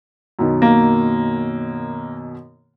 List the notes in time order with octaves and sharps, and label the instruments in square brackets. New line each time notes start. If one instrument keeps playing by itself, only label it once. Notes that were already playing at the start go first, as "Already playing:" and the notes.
[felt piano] F#2 B2 D#3
[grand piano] A#3